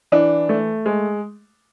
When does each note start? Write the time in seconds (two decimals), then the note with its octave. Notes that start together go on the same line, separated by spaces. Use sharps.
0.12 E3 D4
0.49 A3
0.86 G#3